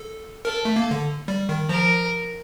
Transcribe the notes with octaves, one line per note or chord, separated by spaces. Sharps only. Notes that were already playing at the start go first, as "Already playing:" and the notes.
Already playing: A4
A4 A#4
A3
A#3
D3
G3
D#3
F3 A#4